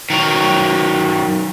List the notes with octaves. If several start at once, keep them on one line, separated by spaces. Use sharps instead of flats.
D#3 F#3